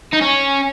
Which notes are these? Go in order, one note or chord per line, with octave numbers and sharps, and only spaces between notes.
D#4
C#4